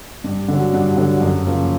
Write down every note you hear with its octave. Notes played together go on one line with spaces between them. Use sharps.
G2
D3 F#3
G2
D3 F#3
F#2
C#3 F3 A#3 C#4